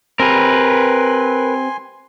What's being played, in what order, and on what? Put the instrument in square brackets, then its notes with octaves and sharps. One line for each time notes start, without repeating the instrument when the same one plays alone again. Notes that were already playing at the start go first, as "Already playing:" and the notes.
[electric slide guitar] C4 G4 [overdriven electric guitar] A#4 B4 [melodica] G#5 C6